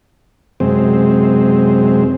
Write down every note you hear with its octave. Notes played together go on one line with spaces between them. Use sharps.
F#2 C3 G#3 C4